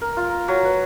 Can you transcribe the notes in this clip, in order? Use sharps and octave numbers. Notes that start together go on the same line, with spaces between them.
A#4
F4
A#4
F#3
B4